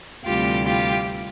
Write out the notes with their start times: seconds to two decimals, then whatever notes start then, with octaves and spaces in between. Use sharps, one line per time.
0.25 D2 C3 E3 G3 F4 G4
0.65 F4 G4